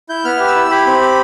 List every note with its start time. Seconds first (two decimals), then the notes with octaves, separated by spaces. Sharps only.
0.09 E4 G6
0.25 B3 F6
0.40 G4
0.47 E6
0.56 E4
0.71 G4 B5
0.86 C4
1.01 G4